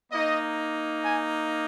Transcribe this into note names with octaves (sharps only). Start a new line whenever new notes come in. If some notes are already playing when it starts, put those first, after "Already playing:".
A#3 D#4 D#5
G#5